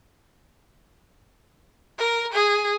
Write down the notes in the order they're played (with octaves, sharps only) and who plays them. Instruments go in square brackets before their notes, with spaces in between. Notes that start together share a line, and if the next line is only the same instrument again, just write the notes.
[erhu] A#4
G#4